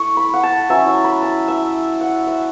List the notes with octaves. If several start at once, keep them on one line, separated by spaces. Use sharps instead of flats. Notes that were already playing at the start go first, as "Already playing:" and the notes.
Already playing: A3 E4 C#6
B5
F#5
A5
F#3 C#4 E4 E5
A5
B5
A5
E5
F#5
E5